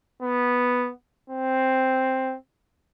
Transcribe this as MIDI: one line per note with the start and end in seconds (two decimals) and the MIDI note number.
0.22 0.91 59
1.30 2.36 60